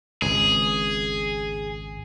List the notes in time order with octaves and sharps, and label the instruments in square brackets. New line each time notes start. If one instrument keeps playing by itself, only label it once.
[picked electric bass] G#1 C#2 [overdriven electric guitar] G#4